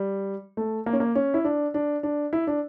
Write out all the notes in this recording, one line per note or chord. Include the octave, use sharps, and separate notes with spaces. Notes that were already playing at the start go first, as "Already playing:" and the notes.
Already playing: G3
A3
A#3
C#4
A#3
C#4
E4
D4
D4
D4
E4
D4